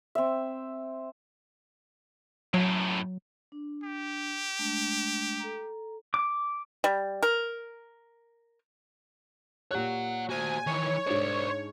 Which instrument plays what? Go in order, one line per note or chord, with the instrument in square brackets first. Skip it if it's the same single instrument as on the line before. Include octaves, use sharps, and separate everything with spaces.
[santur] C4 E5
[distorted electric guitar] F#2 A2 [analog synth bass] F#3
[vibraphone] D4
[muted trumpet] G4
[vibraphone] G#3 A3 D4
A4 A#5
[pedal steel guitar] D6
[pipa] G3
A#4
[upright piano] A#2 G4 F#6 [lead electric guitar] C#5 F#5
[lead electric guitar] F#4 C5 [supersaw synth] G#5
[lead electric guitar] D#3 E3 [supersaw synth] C#5
[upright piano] G#2 D4 [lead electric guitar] C5 D5